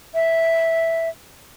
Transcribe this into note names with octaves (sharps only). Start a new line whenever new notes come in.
E5